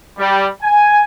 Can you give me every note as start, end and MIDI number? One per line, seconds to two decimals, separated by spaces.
0.18 0.46 55
0.62 1.02 80